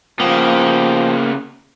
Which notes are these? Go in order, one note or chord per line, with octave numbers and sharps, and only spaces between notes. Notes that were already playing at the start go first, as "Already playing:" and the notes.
C#3 F3 A#3 B3 G5